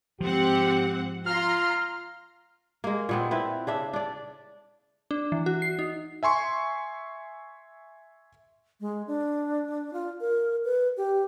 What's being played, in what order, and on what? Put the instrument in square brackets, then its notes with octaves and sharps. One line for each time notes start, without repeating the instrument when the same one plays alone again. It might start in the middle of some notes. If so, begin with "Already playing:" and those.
[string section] G#2 C4 F#5 [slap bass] F3 [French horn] G4
[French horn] F4 [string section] A#5 C6 [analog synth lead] F6
[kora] G#3 A#3
A#2 B3 C4
C4 E4 B4
C#3 D4 E5
D4 D5
[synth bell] D4
E3
F#4
C7
D#4
[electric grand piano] E5 G#5 C6 C#6
[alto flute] G#3
D4
F4
A#4
B4
G4